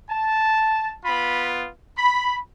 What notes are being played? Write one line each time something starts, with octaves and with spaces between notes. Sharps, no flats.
A5
B3 F4 B5
B5